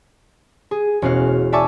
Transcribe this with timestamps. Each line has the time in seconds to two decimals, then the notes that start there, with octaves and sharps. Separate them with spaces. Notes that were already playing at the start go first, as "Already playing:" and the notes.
0.71 G#4
1.02 E1 C#4 F#4 F5
1.52 D5 E5 G#5 A5 C#6 D6